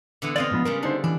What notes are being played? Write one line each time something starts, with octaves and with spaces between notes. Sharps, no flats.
D3 E3 B3
C4 F4 D5 D#5 F5
G#2 F3 B3
C#3 G3 G#3 A#4
D3 D4 D#4 C5
E3 D4